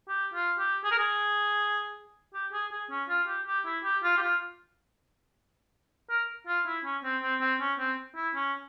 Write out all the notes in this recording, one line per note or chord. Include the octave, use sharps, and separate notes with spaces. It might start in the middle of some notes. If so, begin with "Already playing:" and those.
G4
F4
G4
G#4
A#4
G#4
G4
G#4
G#4
C#4
F4
G4
G4
E4
G4
F4
G4
F4
A#4
F4
E4
C#4
C4
C4
C4
C#4
C4
E4
C#4